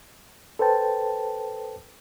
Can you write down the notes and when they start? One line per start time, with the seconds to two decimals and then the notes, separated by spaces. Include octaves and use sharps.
0.59 A4 B4 C5 G5 A5